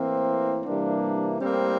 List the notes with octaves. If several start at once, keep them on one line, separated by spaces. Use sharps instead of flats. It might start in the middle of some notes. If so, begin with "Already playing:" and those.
Already playing: A2 E3 A#3 C4
C3 E3 G3 A#3 D4
A2 G3 A#3 C4